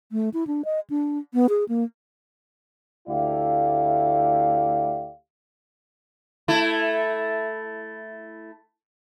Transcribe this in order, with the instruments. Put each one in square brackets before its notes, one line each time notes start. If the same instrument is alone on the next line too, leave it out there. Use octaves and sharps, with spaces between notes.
[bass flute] A3
E4
D4
D#5
D4
B3
G#4
A#3
[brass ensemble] D2 A3 E4 G4 D5 F5
[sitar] A3 E4